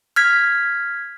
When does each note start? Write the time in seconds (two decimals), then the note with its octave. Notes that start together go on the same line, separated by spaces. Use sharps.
0.16 F6 G#6 B6